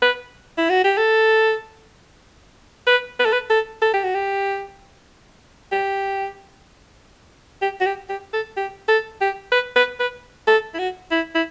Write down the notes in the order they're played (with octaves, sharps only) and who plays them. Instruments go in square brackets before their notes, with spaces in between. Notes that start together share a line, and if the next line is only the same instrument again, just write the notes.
[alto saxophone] B4
E4
F#4
G4
A4
B4
B4
A4
B4
A4
A4
G4
F#4
G4
G4
G4
F#4
G4
G4
A4
G4
A4
G4
B4
B4
B4
A4
E4
F#4
E4
E4